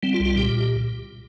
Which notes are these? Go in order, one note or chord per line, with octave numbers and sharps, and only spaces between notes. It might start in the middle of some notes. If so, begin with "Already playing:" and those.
G3 C4
F4
C2
F4
A#2 G4